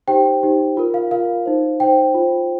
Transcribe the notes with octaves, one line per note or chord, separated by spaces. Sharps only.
D#4 G4 C5 G5
D#4 G4 C5
F4 A#4
F5
F4 A#4 F5
D#4 C5
D#4 C5 G5
F4 C5